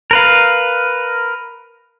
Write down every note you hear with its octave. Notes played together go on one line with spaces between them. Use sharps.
A#4 B4 F5